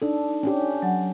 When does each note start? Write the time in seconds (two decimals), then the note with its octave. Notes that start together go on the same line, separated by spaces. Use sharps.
0.02 D4 D#4 A4
0.43 C#4 D4 G4
0.82 F#3 F#5